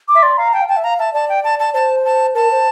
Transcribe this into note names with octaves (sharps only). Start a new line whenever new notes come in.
D6
E5
D5 C6
F5 A#5
G5 A5
F5
G5 A5
E5
F5 A#5
E5 A5
D5 A5
G5
A5
A5
C5 A5
A5
A#4 A5
C5